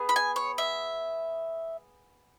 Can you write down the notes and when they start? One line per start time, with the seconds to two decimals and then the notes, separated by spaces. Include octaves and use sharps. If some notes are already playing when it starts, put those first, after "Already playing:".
Already playing: B3 G#4
0.09 B5
0.16 G#5
0.36 C#5
0.58 E5